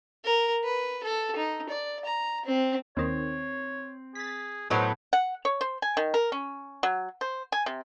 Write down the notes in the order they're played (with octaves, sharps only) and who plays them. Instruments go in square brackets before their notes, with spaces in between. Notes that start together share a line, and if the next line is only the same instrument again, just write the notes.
[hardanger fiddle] A#4
B4
A4
D#4
D5
A#5
C4
[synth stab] D#2 D#3 [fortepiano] C4 [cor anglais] C#5
[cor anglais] G#4 [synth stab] A6 B6
[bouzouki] A2 F#3 B3 [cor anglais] D#4 [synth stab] A4 C5
[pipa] F#5
C#5
C5
G#5
D#3
A#4
C#4
F#3
C5
G#5
C3